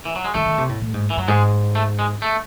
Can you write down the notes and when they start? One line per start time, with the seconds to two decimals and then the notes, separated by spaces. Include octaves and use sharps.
0.05 E3
0.16 F#3
0.24 G#3
0.34 D#3 A3
0.46 D#3
0.58 C3
0.69 A2
0.82 A2
0.94 G#2
1.10 E3
1.17 F#2 F#3
1.28 G#2 G#3
1.75 A3
1.99 G#3
2.22 A3